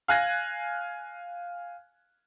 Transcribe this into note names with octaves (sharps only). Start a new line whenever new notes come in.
F5 G#5 F#6 G#6 A#6